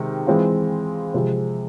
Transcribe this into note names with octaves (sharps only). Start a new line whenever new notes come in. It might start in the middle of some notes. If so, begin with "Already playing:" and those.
Already playing: C3 D#3 G#3
E3 G#3 C4 F4
C3 F3 G#3